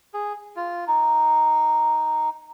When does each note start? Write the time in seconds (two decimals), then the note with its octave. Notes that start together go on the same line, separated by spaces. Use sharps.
0.14 G#4
0.56 F4
0.87 D#4